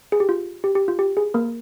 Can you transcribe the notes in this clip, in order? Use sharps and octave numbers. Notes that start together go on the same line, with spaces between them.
G#4
G4
F4
G4
G4
F4
G4
G#4
A#3 A#4